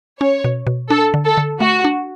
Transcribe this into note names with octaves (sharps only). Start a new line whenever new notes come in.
C#4 C#5
B2
B2
D4 A4
D3
A4
D3
A3 F#4
D4